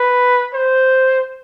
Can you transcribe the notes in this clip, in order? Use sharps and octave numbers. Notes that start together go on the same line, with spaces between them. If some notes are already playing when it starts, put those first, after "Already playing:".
Already playing: B4
C5